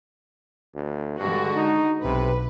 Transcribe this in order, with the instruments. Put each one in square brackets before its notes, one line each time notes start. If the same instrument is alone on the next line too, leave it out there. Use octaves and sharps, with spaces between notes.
[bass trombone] D2
[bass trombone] G2 [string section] D3 G#3 F#4
[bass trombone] D#4
[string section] B1 B4 [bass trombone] C3